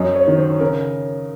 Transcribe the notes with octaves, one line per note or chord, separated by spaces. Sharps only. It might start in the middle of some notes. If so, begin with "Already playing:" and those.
Already playing: F#2 D#5
C#5
D#3 F#3
C5
C#3 A#4